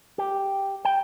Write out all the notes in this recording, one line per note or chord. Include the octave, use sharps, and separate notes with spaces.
G4
G5